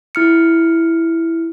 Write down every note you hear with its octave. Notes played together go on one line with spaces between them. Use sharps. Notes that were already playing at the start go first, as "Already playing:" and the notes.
E4 F6 C#7